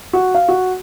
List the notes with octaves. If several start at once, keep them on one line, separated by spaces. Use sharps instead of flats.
F#4
F5
F#4